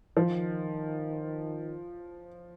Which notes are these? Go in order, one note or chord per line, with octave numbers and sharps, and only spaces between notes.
D#3 F3